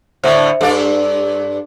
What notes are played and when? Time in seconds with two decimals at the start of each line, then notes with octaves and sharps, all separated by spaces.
0.24 A2 D3 C5 E5
0.61 G2 D4 A4 D5